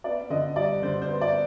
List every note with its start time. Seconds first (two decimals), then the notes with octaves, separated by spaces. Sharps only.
0.04 B3 D5
0.30 D3 D#5
0.56 G3 D5
0.82 D3 C5
1.02 C5
1.08 B3
1.21 D5